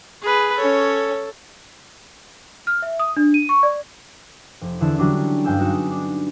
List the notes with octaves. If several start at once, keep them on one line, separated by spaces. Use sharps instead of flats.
G#4 B4
C#4 A4 C#5
F6
E5
D#6
D4
D#7
C#6
D5
F1
E2 D3 E4 A5 E7
D3 F#3 G3 C#4 D4 E4
G2 G#3 F5 G5 G#5 E6
B3 D#4 F#4 E7
D4